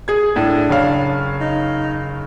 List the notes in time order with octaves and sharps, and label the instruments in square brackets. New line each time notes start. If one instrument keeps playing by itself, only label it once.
[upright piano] G#4 G#6
[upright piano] A2 [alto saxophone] D4
[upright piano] F#1 C#5 F5
[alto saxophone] D#4